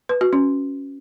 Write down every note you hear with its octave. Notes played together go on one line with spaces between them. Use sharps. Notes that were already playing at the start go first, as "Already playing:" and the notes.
B4
F#4
C#4